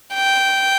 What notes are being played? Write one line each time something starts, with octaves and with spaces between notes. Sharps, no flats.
G5